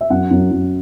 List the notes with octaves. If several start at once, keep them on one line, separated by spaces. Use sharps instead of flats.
E5
F#2 F#5
F#2
F#2